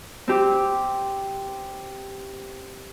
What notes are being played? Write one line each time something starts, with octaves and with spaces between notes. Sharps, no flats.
C4 G4